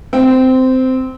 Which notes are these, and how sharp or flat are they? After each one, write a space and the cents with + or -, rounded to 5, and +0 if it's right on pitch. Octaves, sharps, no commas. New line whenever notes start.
C4 -15